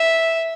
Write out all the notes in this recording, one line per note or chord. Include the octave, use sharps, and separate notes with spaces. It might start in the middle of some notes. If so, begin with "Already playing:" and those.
Already playing: E5